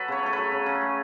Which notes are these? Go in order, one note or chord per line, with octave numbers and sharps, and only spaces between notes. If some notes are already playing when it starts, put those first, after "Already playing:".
Already playing: F#3 A4 B4
C#3 C#5
A3 A4
F#3 B4
C#3
C#3
A3